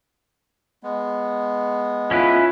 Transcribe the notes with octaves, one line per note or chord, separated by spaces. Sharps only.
G#3 B3
C#4 E4 F4 B4